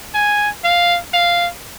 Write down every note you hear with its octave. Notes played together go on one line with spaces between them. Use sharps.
G#5
F5
F5